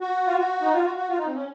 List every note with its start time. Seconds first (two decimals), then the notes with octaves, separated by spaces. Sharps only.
0.01 F#4
0.27 F4
0.37 F#4
0.62 D#4
0.73 F4
0.84 F#4
0.96 F#4
1.09 F4
1.18 D#4
1.27 C4
1.35 C#4